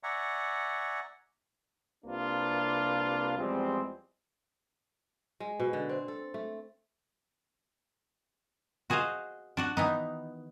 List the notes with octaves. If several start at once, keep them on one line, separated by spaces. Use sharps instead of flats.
D5 E5 F#5 G#5 A#5 C#6
C2 C3 A#3 D4 F4 B4
E2 F3 G3 G#3 C4
G#3
B2
D3
C4
A4
A3
F#4 G#4 C5 D#5 F5
D4 F#4 F#5
D#3 E3 B3 D#4